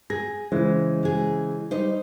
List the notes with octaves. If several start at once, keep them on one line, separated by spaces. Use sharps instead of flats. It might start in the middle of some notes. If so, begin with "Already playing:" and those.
G#4 A#6
C#3 E3 G#3 C5
G#3 G#4
G3 D#4 C5